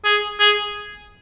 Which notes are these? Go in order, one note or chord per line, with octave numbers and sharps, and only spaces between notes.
G#4
G#4